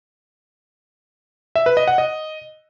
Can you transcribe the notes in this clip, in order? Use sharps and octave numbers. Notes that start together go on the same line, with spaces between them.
E5
B4
D#5
F#5
D#5